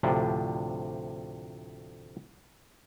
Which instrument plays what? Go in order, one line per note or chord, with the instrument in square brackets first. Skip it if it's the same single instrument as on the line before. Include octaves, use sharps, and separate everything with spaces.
[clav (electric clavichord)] D2 A2 C3 F3 D4